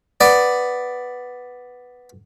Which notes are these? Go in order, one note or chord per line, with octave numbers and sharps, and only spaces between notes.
B3 D5